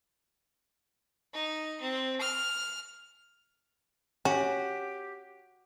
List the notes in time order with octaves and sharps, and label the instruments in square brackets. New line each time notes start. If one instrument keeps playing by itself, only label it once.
[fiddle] D#4
C4
F6
[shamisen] C#4 [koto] F#4 [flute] G4